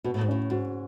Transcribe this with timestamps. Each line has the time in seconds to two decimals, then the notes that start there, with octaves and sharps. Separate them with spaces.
0.04 B2 F#4
0.14 A2
0.21 G#2
0.28 A2 C#4
0.50 G#2 F#4